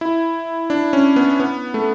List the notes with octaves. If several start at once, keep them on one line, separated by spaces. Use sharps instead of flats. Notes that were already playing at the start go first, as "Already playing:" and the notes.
E4
D4
C#4
B3
B3
A3